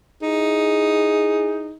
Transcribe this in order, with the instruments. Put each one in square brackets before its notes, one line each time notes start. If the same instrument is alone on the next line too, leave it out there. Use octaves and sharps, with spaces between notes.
[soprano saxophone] D#4 [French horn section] E4 G#4